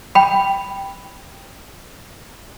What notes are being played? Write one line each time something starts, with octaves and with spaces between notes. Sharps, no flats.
G5 B5